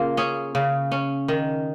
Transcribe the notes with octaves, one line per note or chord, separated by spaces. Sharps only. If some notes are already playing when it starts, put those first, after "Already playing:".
Already playing: C#3 A#3 F4
C#4 G#4
C#3
C#4
D#3